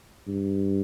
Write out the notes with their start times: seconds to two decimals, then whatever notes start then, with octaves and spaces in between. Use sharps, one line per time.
0.27 G2